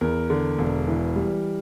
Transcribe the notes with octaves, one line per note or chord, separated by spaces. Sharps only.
E2 A#4
D3
E1
E3
G3